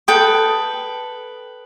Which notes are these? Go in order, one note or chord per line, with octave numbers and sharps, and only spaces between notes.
A4 B4 G5 D#6